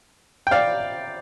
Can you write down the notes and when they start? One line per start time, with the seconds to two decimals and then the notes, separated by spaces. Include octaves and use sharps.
0.47 G5
0.51 D5 F5